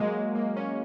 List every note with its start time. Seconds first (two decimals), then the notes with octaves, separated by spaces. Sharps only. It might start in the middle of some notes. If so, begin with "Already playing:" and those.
Already playing: F#3 G#3 A#3
0.13 G#3
0.35 A#3
0.57 C#4